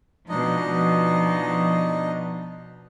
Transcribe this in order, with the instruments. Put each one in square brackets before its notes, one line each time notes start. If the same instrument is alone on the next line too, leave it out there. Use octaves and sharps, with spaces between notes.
[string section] B2 F3 [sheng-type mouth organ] D4 D#4 D#5